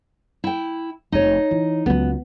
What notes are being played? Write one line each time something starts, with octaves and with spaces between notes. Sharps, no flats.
E4 G5
F1 C3 D#4 C#5
E3
C#2 F#3 B3